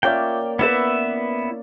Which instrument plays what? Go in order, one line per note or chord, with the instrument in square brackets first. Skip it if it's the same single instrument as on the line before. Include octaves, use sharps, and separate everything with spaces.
[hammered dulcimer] A#3 C#4 D5 [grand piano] F4 C#5 E5 [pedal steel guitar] G5
[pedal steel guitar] B3 E4 E5 [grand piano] B4 A6 E7